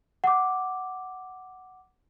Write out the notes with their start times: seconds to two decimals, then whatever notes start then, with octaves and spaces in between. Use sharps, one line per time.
0.24 F#5 D6